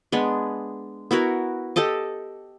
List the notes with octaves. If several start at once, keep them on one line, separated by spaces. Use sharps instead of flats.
G#3 B3 D4
B3 E4 F#4 A#4
G4 A4 D#5 A5